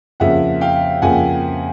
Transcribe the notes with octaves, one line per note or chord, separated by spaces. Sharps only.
F2 C#3 F3 A#3 E5 F#5
F5 G5
F2 C#3 F3 A#3 F#5 G#5